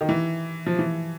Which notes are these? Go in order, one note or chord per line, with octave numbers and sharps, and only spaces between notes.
D#3
E3
F3
E3